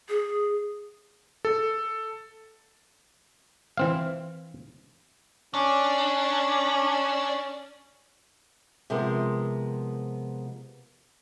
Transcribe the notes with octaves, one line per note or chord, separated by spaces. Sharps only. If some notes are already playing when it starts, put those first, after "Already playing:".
G#4
A4
E3 C4 F5
C#4 D4
C3 F3 G#3 B3 A#4